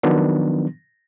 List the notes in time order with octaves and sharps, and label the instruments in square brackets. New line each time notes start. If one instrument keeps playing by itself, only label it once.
[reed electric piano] D#3 F3 F#3 B3 D4